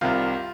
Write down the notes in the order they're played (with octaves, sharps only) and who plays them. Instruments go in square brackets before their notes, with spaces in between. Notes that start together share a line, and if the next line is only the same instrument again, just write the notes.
[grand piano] C2 C3 D#3 F4